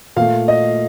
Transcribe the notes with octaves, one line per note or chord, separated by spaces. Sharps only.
A#2 A3 F5
D#5